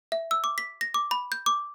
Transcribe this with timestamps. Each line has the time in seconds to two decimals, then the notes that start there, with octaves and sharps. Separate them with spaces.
0.12 E5
0.31 E6
0.44 D6
0.58 B6
0.81 A#6
0.94 D6
1.11 B5
1.32 G6
1.46 D6